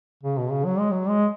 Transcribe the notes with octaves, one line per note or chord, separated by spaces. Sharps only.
C#3
B2
C#3
F#3
G#3
F#3
G#3